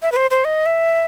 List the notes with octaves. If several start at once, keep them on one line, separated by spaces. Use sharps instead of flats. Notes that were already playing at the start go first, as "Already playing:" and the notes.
E5
B4
C5
C5
D#5
E5